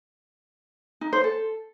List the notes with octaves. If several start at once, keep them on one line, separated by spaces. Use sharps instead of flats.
D#4
C5
A4